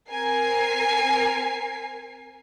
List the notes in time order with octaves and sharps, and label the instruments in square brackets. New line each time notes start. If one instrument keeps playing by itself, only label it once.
[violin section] C4 A#4 G#5 C7